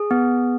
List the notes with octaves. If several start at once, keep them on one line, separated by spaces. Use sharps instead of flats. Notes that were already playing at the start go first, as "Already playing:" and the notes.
Already playing: G#4
B3